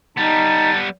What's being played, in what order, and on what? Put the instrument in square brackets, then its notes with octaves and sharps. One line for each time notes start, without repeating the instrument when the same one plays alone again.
[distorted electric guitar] G3 B3 [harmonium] D#4 [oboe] A5